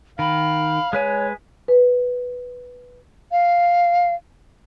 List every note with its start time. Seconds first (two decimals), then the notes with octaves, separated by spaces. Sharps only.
0.19 D#3 F5 B5
0.93 G#3 B4 C#5 G#5
1.68 B4
3.32 F5